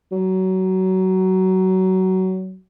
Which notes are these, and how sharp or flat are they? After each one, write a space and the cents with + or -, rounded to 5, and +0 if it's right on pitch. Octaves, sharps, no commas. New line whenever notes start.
F#3 +20